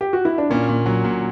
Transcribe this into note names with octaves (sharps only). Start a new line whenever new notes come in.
G4
F#4
E4
D4
A#2 A#3 C#4
A#2
F#3
A#2